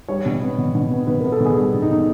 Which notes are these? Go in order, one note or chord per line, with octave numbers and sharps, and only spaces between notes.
G3 C#5
B2
B3
B2
B2
B3
B2 B4
B3 A#4
A4
B2 G#4
G3
B2
D#4
B2